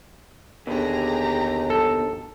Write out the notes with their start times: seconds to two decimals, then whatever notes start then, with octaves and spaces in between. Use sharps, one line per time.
0.67 D#2 B2 D3 G4 G#4 A#5
1.70 A4